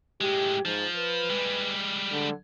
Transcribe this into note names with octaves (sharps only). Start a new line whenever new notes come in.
A2 G#3 G4
G#2 F3
B4
G3 G#3
D3